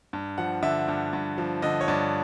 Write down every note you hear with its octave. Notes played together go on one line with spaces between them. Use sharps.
G2
F3 F#5
D3 E5
G2
G2
F3
D3 D#5
C#5
G2 D5